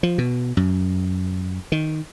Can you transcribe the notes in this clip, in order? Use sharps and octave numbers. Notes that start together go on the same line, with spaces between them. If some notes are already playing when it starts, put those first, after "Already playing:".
F3
B2
F#2
D#3